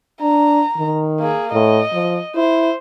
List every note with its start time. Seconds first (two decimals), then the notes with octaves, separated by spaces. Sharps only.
0.21 D4 A#5
0.77 D#3
1.20 A#3 G#4
1.53 A2 D#5
1.93 F3
2.36 E4 C5